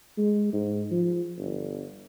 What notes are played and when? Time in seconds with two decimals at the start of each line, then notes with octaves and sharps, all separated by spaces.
0.18 G#3
0.53 G#2
0.91 F3
1.38 G1